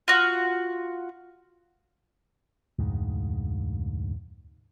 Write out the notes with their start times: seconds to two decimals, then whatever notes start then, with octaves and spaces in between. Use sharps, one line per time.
0.08 F4 F#4
2.79 F1 D2 G#2